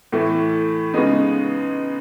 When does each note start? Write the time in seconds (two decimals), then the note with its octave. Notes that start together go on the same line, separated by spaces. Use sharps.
0.12 A2 E3 A3
0.94 C#3 G#3 B3 D#4